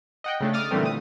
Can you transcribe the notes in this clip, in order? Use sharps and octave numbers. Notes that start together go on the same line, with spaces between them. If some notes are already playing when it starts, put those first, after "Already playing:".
D#5 F#5 G5
C#3 A3 D4
D6 D#6 F6 A6
A#2 D3 E3 G3 A3 C4
D#6